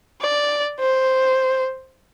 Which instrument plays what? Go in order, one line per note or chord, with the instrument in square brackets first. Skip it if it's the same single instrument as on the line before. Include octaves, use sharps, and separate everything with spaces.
[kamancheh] D5
C5